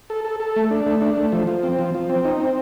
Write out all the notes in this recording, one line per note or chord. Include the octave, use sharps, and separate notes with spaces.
A4
A4
A4
A3
D4
A3
D4
A3
F3
F3
C4
F3
F3
C4
D#4
C4